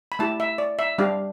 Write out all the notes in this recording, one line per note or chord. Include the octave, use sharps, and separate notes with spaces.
B5
A3 E4 G4 A5
E5
D5
E5
G3 D4 G4 F5